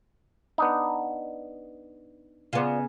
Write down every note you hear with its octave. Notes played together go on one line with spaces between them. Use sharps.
B3 D4 D#4
C#3 B3 F4 D5